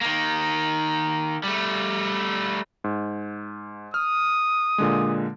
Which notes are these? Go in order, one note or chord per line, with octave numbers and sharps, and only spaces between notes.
D#3 A#3
G3 A3
G#2
D#6 F6
A#2 D3 G#3